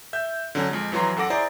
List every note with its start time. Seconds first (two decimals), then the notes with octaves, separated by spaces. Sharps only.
0.13 E5 G6
0.55 D3 F#3 C#4
0.71 F2 G#3
0.92 F2 E3 F#3 A#5 C6
1.17 F#2 A4 F#5 D6 A#6
1.30 E4 G#4 C5 D5 A#5